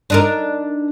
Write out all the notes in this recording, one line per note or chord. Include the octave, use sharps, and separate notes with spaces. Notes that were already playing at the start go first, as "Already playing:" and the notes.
D4 D#4 A#4